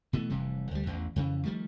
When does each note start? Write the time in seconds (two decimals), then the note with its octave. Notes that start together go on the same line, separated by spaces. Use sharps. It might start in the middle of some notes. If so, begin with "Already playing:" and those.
0.13 B2 E3 A3
0.30 F1 C3 E3 G3
0.71 D2 G3
0.86 A1 E2 E3
1.16 F2 C#3 E3
1.45 D#3 F3 G3 A3